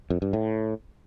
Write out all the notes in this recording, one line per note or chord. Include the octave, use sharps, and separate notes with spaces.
F2
G2
A2